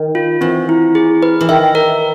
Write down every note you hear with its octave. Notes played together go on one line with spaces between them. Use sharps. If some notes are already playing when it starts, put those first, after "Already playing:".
Already playing: D#3
F4
E3 C4
E4
G#4
B4
E3
D#3 E5
A#4